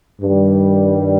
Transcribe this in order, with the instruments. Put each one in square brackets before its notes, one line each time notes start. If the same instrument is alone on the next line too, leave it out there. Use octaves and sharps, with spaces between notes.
[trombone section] G2 D#3 G3